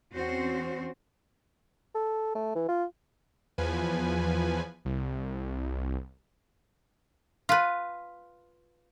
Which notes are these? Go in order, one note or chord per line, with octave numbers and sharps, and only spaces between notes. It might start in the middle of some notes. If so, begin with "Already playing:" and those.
E2 C4 C#4 F#4 C5
A4
A3
E3
F4
E2 F3 B4 G#5
C2
F4 B4